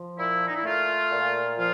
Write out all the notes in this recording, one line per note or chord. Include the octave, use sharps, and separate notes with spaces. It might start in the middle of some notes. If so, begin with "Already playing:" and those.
Already playing: F3
A#2 E4
D#4
E4
A3 F4
A#2
F3 F4